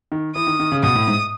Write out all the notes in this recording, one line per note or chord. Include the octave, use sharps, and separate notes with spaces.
D#3
E3 D#6
D#3
D#3
C#3
B2 D#6
A2
G#2